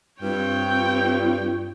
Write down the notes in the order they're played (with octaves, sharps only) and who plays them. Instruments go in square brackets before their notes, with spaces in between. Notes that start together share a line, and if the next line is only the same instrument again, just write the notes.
[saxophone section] G2 [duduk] C4 [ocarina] F4 [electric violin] C#5 G5